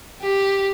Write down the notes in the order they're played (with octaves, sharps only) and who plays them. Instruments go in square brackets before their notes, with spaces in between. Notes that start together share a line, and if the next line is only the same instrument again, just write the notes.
[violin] G4